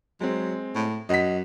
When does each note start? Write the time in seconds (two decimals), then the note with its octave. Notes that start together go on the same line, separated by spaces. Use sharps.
0.20 F#3 G#3 C4
0.75 A2
1.09 F#2 D#5 F#5 B6